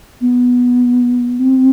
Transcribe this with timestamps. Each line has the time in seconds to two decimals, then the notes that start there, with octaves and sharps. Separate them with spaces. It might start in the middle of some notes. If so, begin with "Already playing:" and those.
0.21 B3
1.39 C4